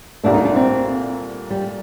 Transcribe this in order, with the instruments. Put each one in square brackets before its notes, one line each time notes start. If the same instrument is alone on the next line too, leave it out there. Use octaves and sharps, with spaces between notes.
[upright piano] C2 A#2 A3 [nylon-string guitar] D4
[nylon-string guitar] D#4
D4
C4
G3